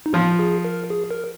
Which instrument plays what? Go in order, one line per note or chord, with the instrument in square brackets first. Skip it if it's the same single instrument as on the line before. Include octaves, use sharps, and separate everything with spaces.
[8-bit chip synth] D#4
[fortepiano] F3 [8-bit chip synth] F4
[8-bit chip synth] G#4
A#4
G#4
A#4